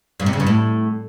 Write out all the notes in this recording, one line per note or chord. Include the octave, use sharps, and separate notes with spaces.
G2
C3
C#3
G2
A2